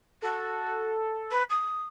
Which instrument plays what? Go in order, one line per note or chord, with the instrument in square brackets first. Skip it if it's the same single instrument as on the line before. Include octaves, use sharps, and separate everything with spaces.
[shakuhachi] F#4 [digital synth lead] A4
[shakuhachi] B4
D#6